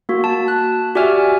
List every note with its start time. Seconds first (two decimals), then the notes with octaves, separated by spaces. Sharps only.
0.09 A#3 F#4
0.24 A5
0.48 F#6
0.95 F#4 G4 D5 E5 G#5 F6